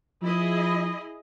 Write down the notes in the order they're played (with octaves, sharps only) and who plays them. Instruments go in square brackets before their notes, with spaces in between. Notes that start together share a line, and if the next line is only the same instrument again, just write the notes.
[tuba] F3 [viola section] E4 G#4 D#5